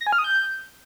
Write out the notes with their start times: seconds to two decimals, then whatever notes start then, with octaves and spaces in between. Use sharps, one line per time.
0.01 A#6
0.07 G#5
0.13 F6
0.18 D#6
0.24 G6